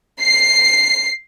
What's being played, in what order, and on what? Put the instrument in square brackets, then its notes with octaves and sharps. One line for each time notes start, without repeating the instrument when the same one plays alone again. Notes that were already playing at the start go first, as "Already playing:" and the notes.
[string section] C7